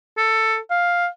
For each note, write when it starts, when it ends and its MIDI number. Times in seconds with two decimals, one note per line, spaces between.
0.18 0.58 69
0.70 1.07 77